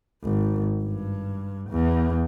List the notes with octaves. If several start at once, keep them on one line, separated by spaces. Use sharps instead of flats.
G#1
G2
E2